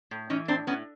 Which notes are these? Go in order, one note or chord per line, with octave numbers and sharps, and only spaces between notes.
A2
E3 C#4 D#4
A2 C4 D4
A2 B3 C#4